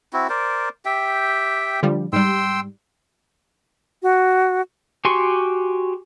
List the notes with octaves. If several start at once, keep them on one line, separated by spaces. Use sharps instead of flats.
C4 E4 F#4
A#4 C5 D5
G4 E5 G5
D3 F3 G3
G#2 G3 G5 C6 E6
F#4
F#4 G4 G#5 C6 C#6